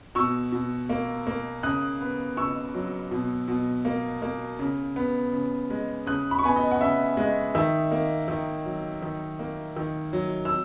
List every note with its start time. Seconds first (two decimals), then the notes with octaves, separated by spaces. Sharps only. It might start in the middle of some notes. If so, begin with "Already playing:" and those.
0.15 B2 C#6 E6
0.52 B2
0.89 A#3
1.27 A#3
1.63 C#3 D#6 F#6
2.01 B3
2.37 C#3 C#6 E6
2.74 F#3
3.11 B2
3.48 B2
3.85 A#3
4.22 A#3
4.59 C#3
4.96 B3
5.33 C#3
5.70 G#3
6.06 C#3 D#6 F#6
6.31 B5
6.39 C#6
6.44 B3 G#5 B5
6.56 D#5
6.71 F#5
6.81 C#3 E5
7.17 G#3
7.55 D#3 E5
7.92 A#3
8.28 D#3
8.65 F#3
9.02 D#3
9.39 A#3
9.76 D#3
10.13 F#3
10.45 E6